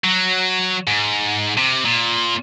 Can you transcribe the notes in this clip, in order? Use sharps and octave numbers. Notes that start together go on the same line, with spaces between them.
F#3
G#2
C3
A#2